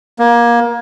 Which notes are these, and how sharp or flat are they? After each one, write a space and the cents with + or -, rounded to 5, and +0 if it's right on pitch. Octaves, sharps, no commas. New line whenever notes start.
A#3 +25